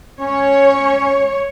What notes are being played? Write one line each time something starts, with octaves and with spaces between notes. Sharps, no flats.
C#4 C#5